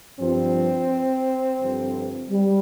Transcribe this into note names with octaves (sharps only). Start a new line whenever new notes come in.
G2 F3 C4
G2 D3 F3
G3